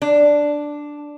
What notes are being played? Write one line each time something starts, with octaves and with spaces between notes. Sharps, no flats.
D4